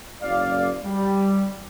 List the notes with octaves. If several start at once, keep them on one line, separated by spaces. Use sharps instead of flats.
F#1 D5 F5
G3